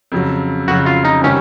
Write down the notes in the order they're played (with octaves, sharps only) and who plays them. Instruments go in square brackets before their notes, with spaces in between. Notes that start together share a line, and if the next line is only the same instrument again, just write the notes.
[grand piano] F2 C#3 F#3
[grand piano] F2 C#3 F#3 [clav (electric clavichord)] F#4
[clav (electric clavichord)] F4
D#4
[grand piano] C3 D#3 G3 [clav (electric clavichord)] C#4